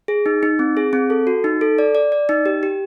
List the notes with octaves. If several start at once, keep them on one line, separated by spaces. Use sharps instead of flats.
G#4
D#4
D#4
C4
G#4
C4
A4
F#4
D#4
A4
D5
D5
D5
D#4
G4
G4